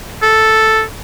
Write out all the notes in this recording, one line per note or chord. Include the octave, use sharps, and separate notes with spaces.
A4